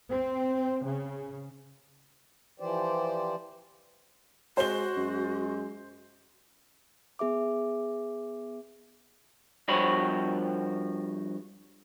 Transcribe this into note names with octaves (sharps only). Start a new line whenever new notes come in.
C4
C#3
E3 F3 G4 C5 D5
G#3 F#4 C5 G7
F#2 G#3
B3 G#4 E5 D6
G2 F3 F#4 C5 C#5 B5